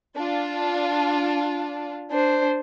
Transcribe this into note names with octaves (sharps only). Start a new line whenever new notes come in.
D4 F4
D4 C5